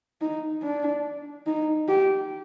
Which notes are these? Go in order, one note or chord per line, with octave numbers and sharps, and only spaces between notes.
D#4
D4
D#4
G4